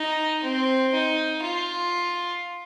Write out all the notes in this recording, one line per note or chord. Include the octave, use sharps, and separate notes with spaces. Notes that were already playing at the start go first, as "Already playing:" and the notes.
Already playing: D#4
C4
D#4
F4